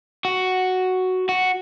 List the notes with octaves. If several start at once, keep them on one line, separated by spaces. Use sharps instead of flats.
F#4
F#4